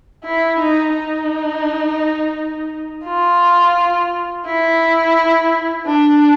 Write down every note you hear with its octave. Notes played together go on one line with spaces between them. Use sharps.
E4
D#4
D#4
F4
E4
D4